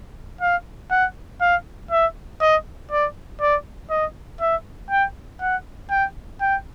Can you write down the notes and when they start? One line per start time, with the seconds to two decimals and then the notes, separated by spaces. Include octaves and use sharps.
0.41 F5
0.91 F#5
1.41 F5
1.91 E5
2.41 D#5
2.91 D5
3.41 D5
3.90 D#5
4.41 E5
4.90 G5
5.41 F#5
5.90 G5
6.41 G5